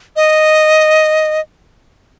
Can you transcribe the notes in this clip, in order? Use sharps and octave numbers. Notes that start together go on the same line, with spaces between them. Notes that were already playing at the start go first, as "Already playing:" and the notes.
D#5